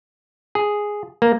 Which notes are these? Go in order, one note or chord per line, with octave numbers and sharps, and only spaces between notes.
G#4
A#3